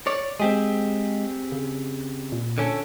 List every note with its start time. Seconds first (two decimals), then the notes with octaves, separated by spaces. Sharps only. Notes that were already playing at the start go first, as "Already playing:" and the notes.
0.07 C#5 D5
0.40 G#3 C4 G4 G#4
1.52 C#3
2.32 A#2
2.58 D3 C#4 A4